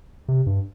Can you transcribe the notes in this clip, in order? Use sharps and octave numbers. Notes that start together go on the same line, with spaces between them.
C3
G2